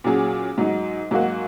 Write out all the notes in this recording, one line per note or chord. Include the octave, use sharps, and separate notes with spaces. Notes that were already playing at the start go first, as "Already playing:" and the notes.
A#2 F#3 C#4 G#4
G#2 F#3 D#4
G#2 F#3 A#3 F#4